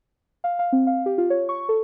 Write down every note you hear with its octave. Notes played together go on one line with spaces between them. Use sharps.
F5
F5
C4
F5
G4
F4
C#5
C#6
A4